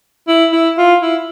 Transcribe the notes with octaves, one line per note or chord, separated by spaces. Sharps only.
E4
E4
F4
E4